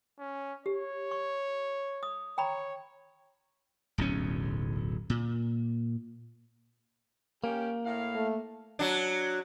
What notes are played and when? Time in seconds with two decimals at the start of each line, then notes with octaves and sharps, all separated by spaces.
0.19 C#4
0.66 G4 C#5
1.11 C#6
2.03 D#6
2.38 C#5 G5 A#5 B5
3.98 D1 B1 E2 C#4
5.10 A#2
7.44 A#3 C#4 G4
7.85 A2 F5
8.15 A3
8.79 F#3 D4